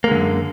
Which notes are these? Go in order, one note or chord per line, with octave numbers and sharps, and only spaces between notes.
F#2 D3 G#3 A#3